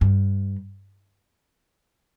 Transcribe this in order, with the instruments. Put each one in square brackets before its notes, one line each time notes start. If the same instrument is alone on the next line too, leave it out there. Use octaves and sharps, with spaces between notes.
[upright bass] G2